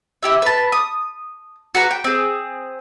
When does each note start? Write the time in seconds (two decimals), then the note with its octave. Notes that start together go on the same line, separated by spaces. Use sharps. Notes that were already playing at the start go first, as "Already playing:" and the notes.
0.23 E4 G4 E5
0.42 B4 A5
0.72 D#6
1.75 F#4 B4 A#5
1.91 G5
2.04 C4 G#4